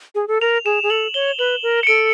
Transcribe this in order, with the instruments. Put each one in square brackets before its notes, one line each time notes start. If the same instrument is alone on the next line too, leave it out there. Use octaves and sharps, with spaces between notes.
[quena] G#4
A4
[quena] A#4 [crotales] F7
[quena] G#4 [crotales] E7
[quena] G#4
[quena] A4 [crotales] F#7
[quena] C#5 [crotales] G7
[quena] B4 [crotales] F#7
[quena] A#4
[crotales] C#7
[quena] A4 [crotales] D7